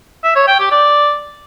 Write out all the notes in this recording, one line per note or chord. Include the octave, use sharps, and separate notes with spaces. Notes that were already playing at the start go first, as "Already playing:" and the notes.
E5
C#5
G5
G4
D5